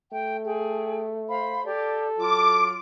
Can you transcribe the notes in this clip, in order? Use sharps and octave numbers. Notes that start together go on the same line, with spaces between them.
A3 G5
G#4 G5
C5 F5 B5
G4 A4 D5
F#3 F4 D6